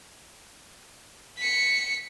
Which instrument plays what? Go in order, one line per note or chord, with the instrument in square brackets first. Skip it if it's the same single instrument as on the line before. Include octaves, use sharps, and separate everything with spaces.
[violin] B6 C#7